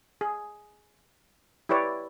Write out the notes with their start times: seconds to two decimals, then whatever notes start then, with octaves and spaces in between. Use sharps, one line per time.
0.21 G#4
1.69 E4 G4 B4 C#5 D5